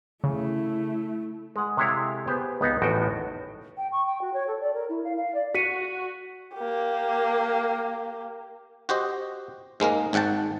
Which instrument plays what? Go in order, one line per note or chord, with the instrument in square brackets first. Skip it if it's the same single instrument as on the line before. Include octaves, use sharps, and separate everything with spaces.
[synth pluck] C#3 [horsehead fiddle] A3 E4
[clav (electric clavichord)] G#3 F#5
C3 G#3 E4 A4 C#5 F5
B3 G4 G#4 B4 C5
C#2 B3 D#4 F#5 A#5
A1 E2 A2 F#4 G5
D#4
[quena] G5
C#6
G5
F#4
C#5
A4
D5
A#4
E4
F5
F5
D5
[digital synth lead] F#4 [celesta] B6 C#7 D#7
[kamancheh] A#3 G4
[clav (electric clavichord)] F#4 G4 C5 D#5
G#2 G#3 A#3 A#4
G#1 G#2 F#5 G5 A5